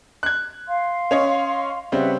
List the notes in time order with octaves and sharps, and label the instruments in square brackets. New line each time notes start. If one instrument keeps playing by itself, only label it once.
[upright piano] F#6 G#6
[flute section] F5 C6
[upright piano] C#4 C#5 D#5
[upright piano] C#3 G3 C4 [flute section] B4 E5 F#5